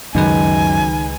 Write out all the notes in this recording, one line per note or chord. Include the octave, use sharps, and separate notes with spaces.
C#2 F#2 D#3 G#3 B4 G#5